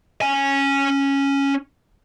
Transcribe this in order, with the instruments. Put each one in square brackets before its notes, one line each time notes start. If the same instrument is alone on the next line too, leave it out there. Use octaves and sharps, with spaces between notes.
[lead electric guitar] C#4 G#5